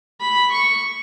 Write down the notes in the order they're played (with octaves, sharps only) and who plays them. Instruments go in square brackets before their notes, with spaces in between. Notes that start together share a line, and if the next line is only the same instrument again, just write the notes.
[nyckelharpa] B5
C#6